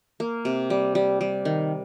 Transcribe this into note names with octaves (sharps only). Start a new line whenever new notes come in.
A#3
C3
G3
G3
G3
D#3